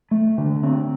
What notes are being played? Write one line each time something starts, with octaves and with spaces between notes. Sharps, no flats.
A3
D3
C4